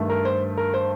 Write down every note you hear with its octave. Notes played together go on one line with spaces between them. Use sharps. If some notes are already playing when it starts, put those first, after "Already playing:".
Already playing: G2 D#3 A3
A#4
C5
A#4
C5